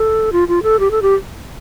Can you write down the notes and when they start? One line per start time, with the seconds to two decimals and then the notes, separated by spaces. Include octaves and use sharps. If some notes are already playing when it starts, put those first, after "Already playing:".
Already playing: A4
0.32 F4
0.48 F4
0.63 A4
0.79 G4
0.91 A4
1.02 G4